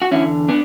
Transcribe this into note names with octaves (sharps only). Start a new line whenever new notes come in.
F#4
E2 D3 C#4 E4
B3 D4